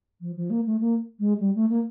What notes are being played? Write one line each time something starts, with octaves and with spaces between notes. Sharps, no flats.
F3
F3
A#3
A3
A#3
G#3
G3
A3
A#3